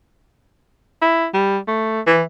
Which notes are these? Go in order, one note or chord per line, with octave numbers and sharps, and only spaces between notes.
E4
G3
A3
E3